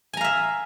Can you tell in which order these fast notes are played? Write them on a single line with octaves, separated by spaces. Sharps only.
G#5 A#5 F5 E5